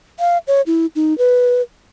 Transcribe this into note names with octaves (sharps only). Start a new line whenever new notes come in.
F5
C#5
E4
D#4
B4